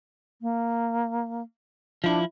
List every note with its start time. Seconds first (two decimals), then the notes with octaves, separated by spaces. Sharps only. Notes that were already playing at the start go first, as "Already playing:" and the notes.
0.42 A#3
2.04 F3 D4 E4